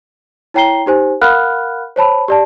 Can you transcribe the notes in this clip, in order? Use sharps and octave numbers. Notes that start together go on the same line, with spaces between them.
E4 C#5 G5 A#5 C7 G7
D#4 G4 C5 G#5
A#4 F5 F#5 B5 F6 F#6
C5 C#5 A5 B5
G4 D5 A5